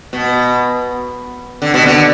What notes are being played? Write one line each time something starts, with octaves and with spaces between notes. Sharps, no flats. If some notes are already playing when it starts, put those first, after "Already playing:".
B2
D3
B2
D3